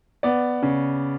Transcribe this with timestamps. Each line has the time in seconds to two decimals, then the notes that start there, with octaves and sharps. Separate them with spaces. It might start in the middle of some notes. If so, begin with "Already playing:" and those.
0.23 B3 D5
0.62 C#3